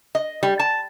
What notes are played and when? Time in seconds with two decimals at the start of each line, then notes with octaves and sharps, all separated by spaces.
0.15 D#5
0.43 G3
0.59 A5